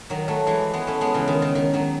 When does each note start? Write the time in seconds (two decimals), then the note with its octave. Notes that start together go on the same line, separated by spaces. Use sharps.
0.10 D#3 F#3
0.28 F#3 A3
0.47 E3 G#3
0.73 G#3 B3
0.87 A3 C#4
1.01 G#3 B3
1.14 C#3 E3
1.28 D#3
1.42 C#3
1.55 D#3
1.74 D#3 F#3